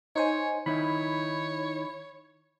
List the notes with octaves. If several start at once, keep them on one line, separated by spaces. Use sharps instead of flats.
D#4 C5 C#5 G#5
D#3 D#4 E4 C#5 B5